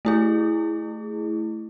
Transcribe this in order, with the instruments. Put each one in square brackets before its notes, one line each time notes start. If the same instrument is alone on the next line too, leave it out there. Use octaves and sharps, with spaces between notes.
[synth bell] A3 E4 G#4